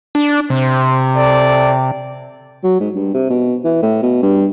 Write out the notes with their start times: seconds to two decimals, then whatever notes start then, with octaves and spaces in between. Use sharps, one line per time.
0.15 D4
0.50 C3 C5
1.15 A4 D5
2.64 F#3
2.80 G#2
2.95 G2
3.14 C3
3.30 B2
3.65 E3
3.82 A2
4.02 B2
4.22 G2